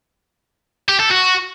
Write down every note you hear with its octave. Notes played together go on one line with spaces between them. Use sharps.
G4
A4
F#4